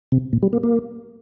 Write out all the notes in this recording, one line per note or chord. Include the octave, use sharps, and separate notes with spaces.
C3
A#2
G3
A#3
A#3